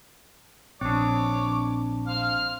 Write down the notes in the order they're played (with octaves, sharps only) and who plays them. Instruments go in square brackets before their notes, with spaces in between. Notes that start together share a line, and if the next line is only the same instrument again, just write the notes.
[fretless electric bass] A#1 [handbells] C4 D4 [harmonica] C#5 D6
[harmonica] C5 F5 [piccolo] F6